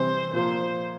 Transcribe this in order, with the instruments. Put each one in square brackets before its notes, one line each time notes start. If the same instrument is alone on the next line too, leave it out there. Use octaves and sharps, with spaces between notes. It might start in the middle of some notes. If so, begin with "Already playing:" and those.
Already playing: [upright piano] C3 E3 G3 C4 [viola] C5
[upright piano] A#2 F3 A#3 [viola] C5